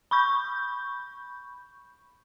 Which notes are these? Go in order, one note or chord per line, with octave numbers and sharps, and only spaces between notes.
B5 C#6 G6